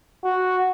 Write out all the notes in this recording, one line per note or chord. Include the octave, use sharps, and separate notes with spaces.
F#4